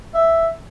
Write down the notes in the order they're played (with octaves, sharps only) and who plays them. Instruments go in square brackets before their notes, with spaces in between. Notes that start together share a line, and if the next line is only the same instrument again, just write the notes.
[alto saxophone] E5